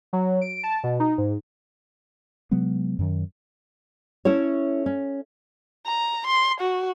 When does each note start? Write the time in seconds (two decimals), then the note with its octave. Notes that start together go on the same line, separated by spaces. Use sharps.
0.13 F#3
0.41 D7
0.63 A5
0.84 B2
1.00 D#4
1.18 G#2
2.51 C3 F#3 G#3 B3
2.99 F#2 D#3
4.25 C#4 E4 A4 C#5
4.86 C#4
5.87 A#5
6.27 C6
6.61 F#4